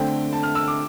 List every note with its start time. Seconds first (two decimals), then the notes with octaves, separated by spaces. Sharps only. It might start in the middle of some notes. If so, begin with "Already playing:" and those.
Already playing: D3 A3 C4 G5
0.33 A5
0.43 F6
0.55 E6
0.68 D6